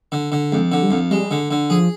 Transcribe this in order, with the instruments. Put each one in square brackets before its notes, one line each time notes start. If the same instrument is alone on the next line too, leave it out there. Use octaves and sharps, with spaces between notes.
[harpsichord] D3
D3
[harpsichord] F2 [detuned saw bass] G#3
[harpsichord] D3
[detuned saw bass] G3
[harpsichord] F2
[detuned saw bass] G3 [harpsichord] G#3
[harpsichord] D3
D3
[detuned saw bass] F3 [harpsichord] G#4